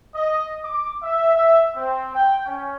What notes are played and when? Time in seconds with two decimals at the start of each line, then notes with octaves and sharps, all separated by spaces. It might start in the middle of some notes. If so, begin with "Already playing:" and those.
0.14 D#5
0.62 D6
1.02 E5
1.34 E5
1.74 C4
2.13 G5
2.45 C#4